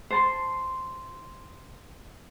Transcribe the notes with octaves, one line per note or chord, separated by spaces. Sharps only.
C5 A5 C6